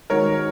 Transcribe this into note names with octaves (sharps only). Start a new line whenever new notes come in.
D#3 G#3 D#4 F#4 A#4 C#5